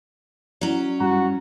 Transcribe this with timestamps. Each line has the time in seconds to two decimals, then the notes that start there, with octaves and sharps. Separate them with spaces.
0.61 F#3 C#4 E4 D5
1.00 G2 G3 F#4 A#5